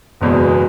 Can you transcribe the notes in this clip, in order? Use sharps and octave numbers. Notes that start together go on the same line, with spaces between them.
F#1 E2 B2 G#3